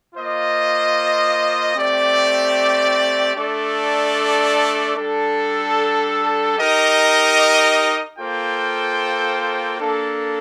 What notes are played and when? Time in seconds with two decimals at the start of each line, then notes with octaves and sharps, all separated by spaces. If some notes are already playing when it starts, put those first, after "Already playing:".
0.15 A#3 F4 C5 D#5
1.75 A3 C4 G4 D5
3.36 A3 D4 A4 D5
4.97 G3 D4 A4
6.58 D#4 G4 A#4 D#5
8.19 A#3 F4 A4 C5 G5
9.79 A#3 D4 A4